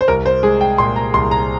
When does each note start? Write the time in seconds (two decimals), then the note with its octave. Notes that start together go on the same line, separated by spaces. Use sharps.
0.01 C5
0.08 C2 A#4
0.26 C5
0.43 G#3 G#4
0.61 G5
0.78 A#2 C6
0.96 A#5
1.14 C2 C6
1.31 A#5